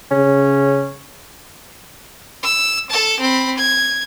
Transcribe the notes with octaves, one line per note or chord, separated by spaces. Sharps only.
C#3 C#4
E6
A4 A5
C4 B5
G#6